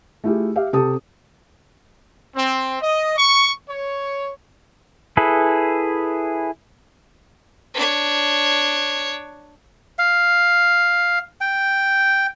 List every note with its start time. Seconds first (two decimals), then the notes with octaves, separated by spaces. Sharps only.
0.24 A3 E4 F4 G4 G#4
0.55 G4 E5 F5
0.73 C3 G4 A4 A5 D#6
2.36 C4
2.81 D#5
3.17 C#6
3.70 C#5
5.17 E4 G#4 A4 B4
7.74 D4 C#5
9.99 F5
11.41 G5